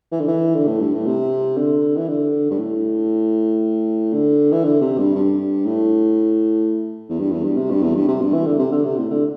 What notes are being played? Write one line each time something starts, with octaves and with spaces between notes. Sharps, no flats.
E3
D3
E3
D3
A2
G2
A2
C3
D3
E3
D3
G2
A2
D3
E3
D3
C3
G2
G2
A2
E2
G2
E2
G2
C3
G2
E2
G2
C3
G2
E3
D3
C3
D3
C3
A2
D3